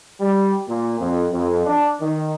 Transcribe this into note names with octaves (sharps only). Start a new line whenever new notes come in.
G3
A#2
F2
F2
D4
D#3